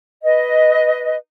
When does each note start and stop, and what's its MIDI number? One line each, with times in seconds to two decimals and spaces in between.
0.23 1.15 71
0.23 1.15 75